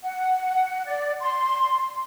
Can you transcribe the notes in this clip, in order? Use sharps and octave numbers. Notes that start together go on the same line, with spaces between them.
F#5
D5
C6